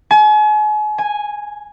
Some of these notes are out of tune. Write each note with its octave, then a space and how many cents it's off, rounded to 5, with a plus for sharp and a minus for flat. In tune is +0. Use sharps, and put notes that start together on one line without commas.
G#5 +40
G#5 -5